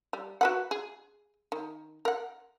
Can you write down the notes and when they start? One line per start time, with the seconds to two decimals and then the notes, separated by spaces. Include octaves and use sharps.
0.13 G3
0.41 F#4 B4 F#5
0.71 G#4
1.52 D#3
2.05 A#4 F#5